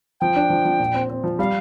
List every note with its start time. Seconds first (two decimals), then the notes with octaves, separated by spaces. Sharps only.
0.20 F3 G5
0.36 D4
0.50 F3
0.65 F3
0.79 A#2
0.94 C4
1.09 C4
1.24 F3
1.39 G3 F5